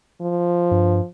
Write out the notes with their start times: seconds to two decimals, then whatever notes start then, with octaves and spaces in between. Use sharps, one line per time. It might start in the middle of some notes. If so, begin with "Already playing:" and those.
0.21 F3
0.71 G2